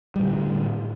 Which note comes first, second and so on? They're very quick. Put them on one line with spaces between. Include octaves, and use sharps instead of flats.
G3 A2 D3